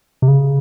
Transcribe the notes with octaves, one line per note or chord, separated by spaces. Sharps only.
C3
C#3